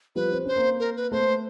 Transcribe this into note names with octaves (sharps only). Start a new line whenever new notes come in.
F3 G3 B4
C4
C#4 C5
A#3 C4
A#4
B4
A3 B3 C5